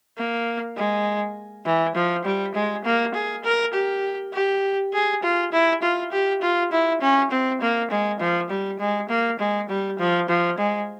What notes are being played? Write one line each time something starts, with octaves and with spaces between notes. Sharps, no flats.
A#3
G#3
E3
F3
G3
G#3
A#3
G#4
A#4
G4
G4
G#4
F4
E4
F4
G4
F4
E4
C#4
C4
A#3
G#3
F3
G3
G#3
A#3
G#3
G3
F3
F3
G#3